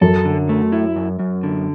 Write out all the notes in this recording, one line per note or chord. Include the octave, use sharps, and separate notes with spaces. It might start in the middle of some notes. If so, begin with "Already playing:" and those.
F#2 A4
D3
A3
E4
F#2
F#2
D3